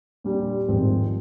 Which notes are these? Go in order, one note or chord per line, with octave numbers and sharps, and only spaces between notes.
A#2 G3 D4 G4
G#1 G2 F3 G#3 C4